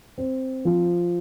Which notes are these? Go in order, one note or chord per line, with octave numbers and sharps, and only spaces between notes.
C4
F3